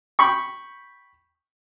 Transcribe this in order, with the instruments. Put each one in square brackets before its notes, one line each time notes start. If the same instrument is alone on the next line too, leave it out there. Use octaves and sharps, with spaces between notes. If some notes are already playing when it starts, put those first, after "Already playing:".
[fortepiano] G5 B5 C#6